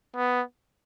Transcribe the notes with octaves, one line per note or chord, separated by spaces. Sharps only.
B3